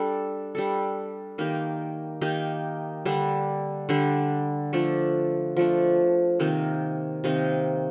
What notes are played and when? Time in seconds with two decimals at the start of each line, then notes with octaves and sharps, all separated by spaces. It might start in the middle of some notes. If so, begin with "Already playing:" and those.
Already playing: G3 D4 A4
0.55 G3 D4 A4
1.38 D#3 A#3 D#4 G4
2.21 D#3 A#3 D#4 G4
3.06 D3 G3 D4
3.89 D3 G3 D4
4.73 F3 A3 D4
5.57 F3 A3 D4
6.40 C3 D#3 A#3 D#4
7.24 C3 D#3 A#3 D#4